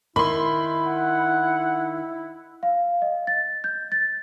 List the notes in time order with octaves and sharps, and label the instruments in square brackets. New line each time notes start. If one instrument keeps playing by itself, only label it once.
[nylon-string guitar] D#3 [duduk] E4 [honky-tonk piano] B5 C6
[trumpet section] F#5
[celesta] F5
D#5
A6
G6
A6